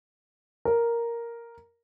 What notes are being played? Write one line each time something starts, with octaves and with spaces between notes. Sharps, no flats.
A#4